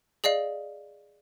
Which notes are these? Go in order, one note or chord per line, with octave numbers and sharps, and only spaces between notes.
G#4 D5 D#5 F5